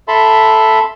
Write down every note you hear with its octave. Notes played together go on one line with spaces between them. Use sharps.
A4 E5 A5 B5 C6